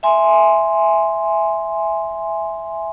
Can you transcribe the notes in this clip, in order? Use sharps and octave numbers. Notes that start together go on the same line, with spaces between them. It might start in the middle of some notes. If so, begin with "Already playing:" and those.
E5 G#5 C6